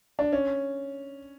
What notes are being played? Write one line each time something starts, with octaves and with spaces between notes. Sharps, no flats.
D4
C#4